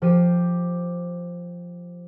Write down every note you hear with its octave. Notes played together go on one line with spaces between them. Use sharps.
F3 G4 C5 D#7